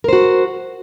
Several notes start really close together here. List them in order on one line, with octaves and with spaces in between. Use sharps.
A#4 C5 F#4